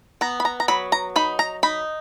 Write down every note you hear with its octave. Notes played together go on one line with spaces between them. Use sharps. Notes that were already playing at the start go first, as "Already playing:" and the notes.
B3 A#5
B5
A#5
A#5
F#3 B5
A#5
D#4 B5
A#5
D#4 B5